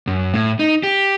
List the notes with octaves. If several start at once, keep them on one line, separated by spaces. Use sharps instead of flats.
F#2
A2
D#4
G4